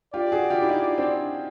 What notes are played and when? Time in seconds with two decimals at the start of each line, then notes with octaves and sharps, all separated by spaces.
0.14 F4 G4 D5
0.32 F#4 G#4
0.50 F4 G4
0.62 E4
0.69 D#4 F4
0.98 C4 D4